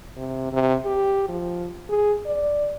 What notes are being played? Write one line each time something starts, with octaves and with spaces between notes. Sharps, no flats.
C3
C3
G4
F3
G#4
D5